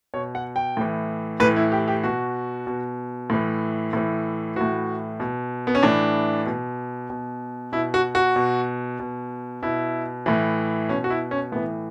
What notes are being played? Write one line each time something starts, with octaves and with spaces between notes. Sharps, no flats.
B2 C#5
F#5
G5
A2 E3
A2 E3 B4
E4
G4
G4
B2 F#4
B2
A2 E3
A2 E3
A2 E3 F#4
B2
B3
C#4
A2 E3 D4
B2
B2
B2 E4
F#4
F#4
B2
B2
B2 E4
A2 E3
B2 C#4
F#4
E4
C#4
A2 E3 B3